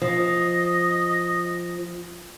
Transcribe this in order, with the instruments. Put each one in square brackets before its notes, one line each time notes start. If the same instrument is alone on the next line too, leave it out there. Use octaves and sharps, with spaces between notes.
[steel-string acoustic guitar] F3 [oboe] D#5